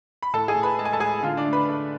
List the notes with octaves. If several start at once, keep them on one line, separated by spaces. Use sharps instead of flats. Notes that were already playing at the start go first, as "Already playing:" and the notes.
B5
A2 A4 A5
G#4 G#5
A2
B4 B5
G#3 A5
G#5
A4 A5
A2 G#4 G#5
D3 F4 F5
D4 D5
A3
B4 B5
A3